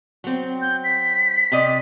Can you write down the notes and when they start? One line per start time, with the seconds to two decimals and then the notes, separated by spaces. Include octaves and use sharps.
0.24 F#3 C4
0.62 G6
0.84 B6
1.52 C3 D5 D#5